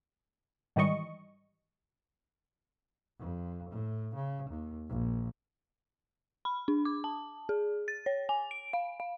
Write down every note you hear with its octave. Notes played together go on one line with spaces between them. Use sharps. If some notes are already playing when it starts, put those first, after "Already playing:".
G#2 D#3 E3 G3 D#5 C#6
F2
A2
C#3
D#2
A#1
B5
D4
D6
A5
G#4
A6
C#5
G#5
D7
F5
F5